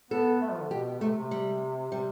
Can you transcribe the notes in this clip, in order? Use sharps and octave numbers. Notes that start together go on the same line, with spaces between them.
B3 A4
A3
F3
D3
B2 G4
C3 A3
C3
G3
C3 G3